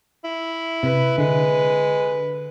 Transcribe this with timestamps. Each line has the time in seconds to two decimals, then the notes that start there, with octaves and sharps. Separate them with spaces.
0.24 E4
0.83 C3 B4
1.18 D3 G#3